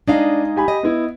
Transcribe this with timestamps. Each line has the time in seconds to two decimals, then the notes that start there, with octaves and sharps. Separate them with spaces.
0.08 G#3 D4 D#4 D#5 F5
0.56 G4 G#5 B5
0.68 D#5
0.83 B3 E4